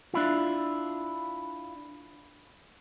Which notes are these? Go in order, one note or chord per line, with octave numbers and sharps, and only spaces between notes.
D4 E4 F4